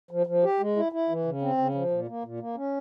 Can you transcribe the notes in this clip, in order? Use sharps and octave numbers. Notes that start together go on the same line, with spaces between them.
F3
F3
G4
G#3
E4
E4
E3
C#3
C4
C#3
F3
A#2
A#3
A#2
A#3
C#4